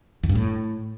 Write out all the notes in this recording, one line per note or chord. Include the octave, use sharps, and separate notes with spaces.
E2
G2
A2